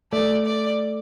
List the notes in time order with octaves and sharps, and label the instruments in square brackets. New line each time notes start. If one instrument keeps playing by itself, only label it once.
[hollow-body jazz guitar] A3 [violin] D5
[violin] D5